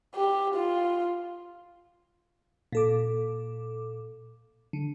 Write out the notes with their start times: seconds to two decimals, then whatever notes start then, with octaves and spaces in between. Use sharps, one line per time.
0.15 G4
0.55 F4
2.72 A#2 A4 D6
4.73 D3